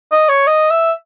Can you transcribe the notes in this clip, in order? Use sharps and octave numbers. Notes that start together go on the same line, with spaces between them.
D#5
C#5
D#5
E5